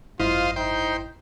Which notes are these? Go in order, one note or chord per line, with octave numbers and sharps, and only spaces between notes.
G#1 F#2 E4 F4 C5 D#5 F5
D#4 C5 G5